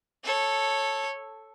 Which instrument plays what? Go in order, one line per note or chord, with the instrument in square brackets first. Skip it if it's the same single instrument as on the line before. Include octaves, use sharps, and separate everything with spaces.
[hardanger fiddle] A4 C#5